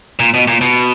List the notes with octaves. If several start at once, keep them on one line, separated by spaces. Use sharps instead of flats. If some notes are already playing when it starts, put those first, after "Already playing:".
A#2
B2
A#2
B2